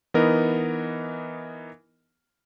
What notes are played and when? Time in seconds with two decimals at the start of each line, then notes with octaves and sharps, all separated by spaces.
0.14 E3 B3 D#4 A#4 D#5